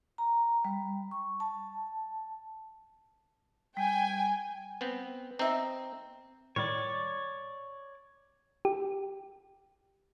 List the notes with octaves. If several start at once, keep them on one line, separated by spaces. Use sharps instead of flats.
A#5
G3
C#6
A5
G3 G5 G#5
B3 C4
C4 D#4 E5
A2 D#3 G3 C#5 D5
G4